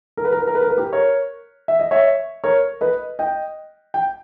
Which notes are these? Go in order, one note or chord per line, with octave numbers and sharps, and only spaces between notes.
A#4
B4
A#4
B4
A#4
B4
A#4
B4
G4 A#4
A#4 C#5
E5
D#5
C#5 E5
A#4 C#5
B4 D#5
D#5 G5
G5